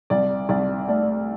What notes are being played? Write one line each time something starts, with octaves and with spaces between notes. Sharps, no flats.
C2 D5
C2 D5
A3 D5